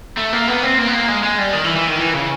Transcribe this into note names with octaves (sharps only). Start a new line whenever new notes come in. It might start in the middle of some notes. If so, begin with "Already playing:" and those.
A3
A#3
B3
C4
A#3
B3
A#3
G#3
G#3
G3
D#3
E3
E3
D#3
E3
C#3